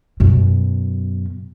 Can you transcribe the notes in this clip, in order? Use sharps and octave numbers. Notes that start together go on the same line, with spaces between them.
F#2 B2